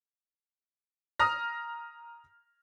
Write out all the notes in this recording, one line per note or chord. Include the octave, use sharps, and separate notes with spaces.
A#5 D#6 F6 A#6